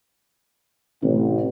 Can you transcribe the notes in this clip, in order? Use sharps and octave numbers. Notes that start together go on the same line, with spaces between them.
A1 C3